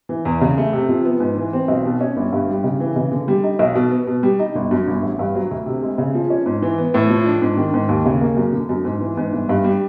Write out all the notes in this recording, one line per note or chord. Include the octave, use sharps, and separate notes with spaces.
E3
E2
C#3
A3
C3
F3
B3
G#2
E3
C4
B1
B2
C#4
G1
G2
G3
C#3
E3
C#3
D3
G3
D#4
B1
B2
B3
B2
G3
D#4
G1
F#2
G1
A1
G2
F#3
D2
C3
G#3
C#3
F3
C#4
G#2
E3
B3
A2
F3
D4
G#2
D#3
G#2
D#2
C#3
A#3
F#2
D3
F#2
G#2
E3
G#2
G1
G2
G3